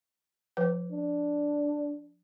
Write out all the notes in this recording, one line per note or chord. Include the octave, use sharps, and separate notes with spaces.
F3 B4
D4